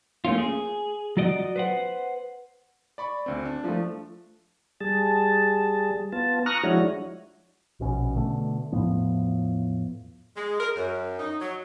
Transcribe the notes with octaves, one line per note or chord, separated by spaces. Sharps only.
A3 A#3 C#4 F4
G#4
F#3 F4 F#4 D5 D#5
B4 C5 F#5
D5 B5 C#6
D2 C4
D4
F3 A3
G3 G#4 A5
B3 F4 A5
A#5 C#6 D#6 F6 F#6 A#6
F3 G#3 D4 E4 F#4 C#5
A#1 B2 C#4
B2 D3 A3
E2 A2 F3 B3
G#3
A#4
F#2
D#4
F#3